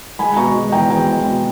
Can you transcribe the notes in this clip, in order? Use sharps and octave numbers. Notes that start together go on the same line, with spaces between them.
G#3 G#5 B5
B2 A#5 C#6
G#3
E2 G5 A#5
E2 G5 A#5
G#3
B2